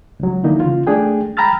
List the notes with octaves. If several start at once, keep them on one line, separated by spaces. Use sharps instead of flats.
C#2 F#3
D3 E3 A#3 D#4 E4
C#3 F4
A3 D4 G#4 G5
G5 A#5 B5 E6 F6 A6